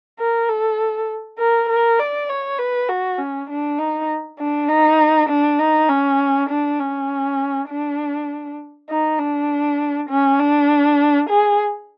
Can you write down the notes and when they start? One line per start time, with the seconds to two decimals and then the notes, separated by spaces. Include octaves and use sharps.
0.19 A#4
0.49 A4
1.38 A#4
1.69 A#4
1.99 D5
2.29 C#5
2.59 B4
2.89 F#4
3.18 C#4
3.49 D4
3.79 D#4
4.39 D4
4.69 D#4
5.29 D4
5.59 D#4
5.88 C#4
6.49 D4
6.79 C#4
7.69 D4
8.89 D#4
9.19 D4
10.09 C#4
10.39 D4
11.29 G#4